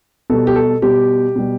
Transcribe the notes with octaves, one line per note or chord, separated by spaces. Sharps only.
B2 G3 A4
G4
A4
B2 G3 G4
B2 G3